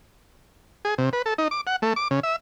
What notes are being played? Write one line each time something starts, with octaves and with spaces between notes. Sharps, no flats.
G#4
C3
B4
A4
D#4
D6
F#5
A3
D6
C#3
E5